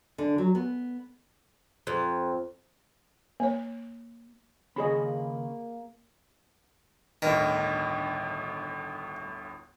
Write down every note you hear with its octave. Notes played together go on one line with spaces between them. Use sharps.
D3
F#3
B3
F2
A#3 C#5
D#2 C#3 A#3 C#4 G#4 D#5 B5
G1 D2 A2 D#3